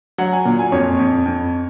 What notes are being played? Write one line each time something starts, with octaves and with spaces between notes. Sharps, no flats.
F#3 F#5
G#5
A#2
G#5
F2 C#5
F2
F2